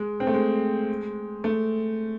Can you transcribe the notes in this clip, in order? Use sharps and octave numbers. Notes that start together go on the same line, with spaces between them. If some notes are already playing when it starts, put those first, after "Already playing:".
Already playing: G#3
C4
A3
G#3
A3